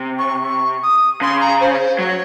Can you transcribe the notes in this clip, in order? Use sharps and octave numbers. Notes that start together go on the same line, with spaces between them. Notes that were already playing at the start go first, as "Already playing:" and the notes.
Already playing: C3
C#6
C#6
D#6
C#3 C6
A#5
C5
C#5
C5
F#3 C#5